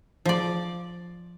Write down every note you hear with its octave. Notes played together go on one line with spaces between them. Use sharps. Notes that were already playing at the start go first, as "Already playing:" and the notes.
F3 D5